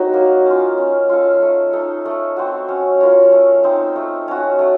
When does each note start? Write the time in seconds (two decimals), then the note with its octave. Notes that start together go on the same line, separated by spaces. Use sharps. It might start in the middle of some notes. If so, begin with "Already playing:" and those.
Already playing: F#3 C4 D#4 F#4
0.14 A#3
0.46 C#4 F4
0.78 C#4
1.09 F4 A4
1.42 A3
1.73 D#4 A4
2.05 A3
2.37 C4 F#4
2.69 C#4
3.00 F4 A#4 C#5
3.32 A3
3.64 C4 D#4
3.96 A3
4.28 C#4 F#4
4.59 A3